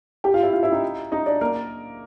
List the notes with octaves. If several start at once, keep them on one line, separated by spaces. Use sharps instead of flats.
G4 G5
F4 F5
E4 E5
F4 F5
E4 E5
D#4 D#5
D#4 D#5
D4 D5
A#3 A#4